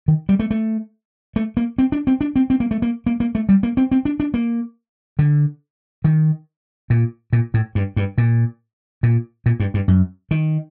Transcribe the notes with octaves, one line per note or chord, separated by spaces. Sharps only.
D#3
G3
A3
A3
A3
A#3
C4
D4
C4
D4
C4
C4
A#3
A3
A#3
A#3
A#3
A3
G3
A#3
C4
C4
D4
D4
A#3
D3
D#3
A#2
A#2
A2
G2
G2
A#2
A#2
A#2
G2
G2
F#2
D#3